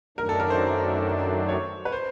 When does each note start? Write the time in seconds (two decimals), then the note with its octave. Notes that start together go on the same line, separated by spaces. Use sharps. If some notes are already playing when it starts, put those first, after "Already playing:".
0.17 F#2 D#3 F#3 A3 D4 A#4
0.29 A4
0.40 A#4
0.50 C5
1.49 C#5
1.85 B4
1.92 C5